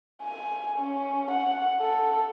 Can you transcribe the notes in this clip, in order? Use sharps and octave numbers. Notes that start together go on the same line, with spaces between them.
G#5
C#4
F#5
A4